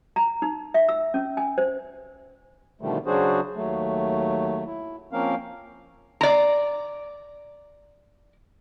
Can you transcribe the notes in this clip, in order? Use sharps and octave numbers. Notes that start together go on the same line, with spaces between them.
A#5
D#4
E5
E6
C#4
G#5
C5
B2 D3 D#3 F3 G3 A3
C#3 F#3 D4 F#4 G#4 C5
D#2 F#3 A3
E4
F3 A#3 C4 C#4 A#4 F5
D5 A#5